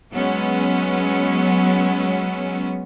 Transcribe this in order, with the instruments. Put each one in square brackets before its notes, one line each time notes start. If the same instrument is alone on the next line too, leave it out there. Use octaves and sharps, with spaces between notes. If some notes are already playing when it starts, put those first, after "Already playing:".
[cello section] F#3 G#3 B3 C#4